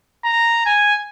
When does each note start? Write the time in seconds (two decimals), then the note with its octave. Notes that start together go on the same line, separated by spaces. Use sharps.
0.25 A#5
0.66 G#5